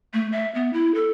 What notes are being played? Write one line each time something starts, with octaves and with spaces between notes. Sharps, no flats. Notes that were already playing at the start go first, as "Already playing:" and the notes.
A3
E5
B3
E4
A4